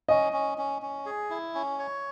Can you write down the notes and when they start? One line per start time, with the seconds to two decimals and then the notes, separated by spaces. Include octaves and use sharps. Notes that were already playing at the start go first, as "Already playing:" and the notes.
0.09 C#4 D#5
0.33 C#4
0.58 C#4
0.82 C#4
1.06 G#4
1.30 E4
1.55 C#4
1.79 C#5